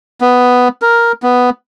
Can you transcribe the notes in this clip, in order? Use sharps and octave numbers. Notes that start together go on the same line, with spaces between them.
B3
A#4
B3